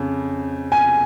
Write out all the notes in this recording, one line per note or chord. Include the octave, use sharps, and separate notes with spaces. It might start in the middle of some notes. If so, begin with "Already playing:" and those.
Already playing: F2 C#3
G#5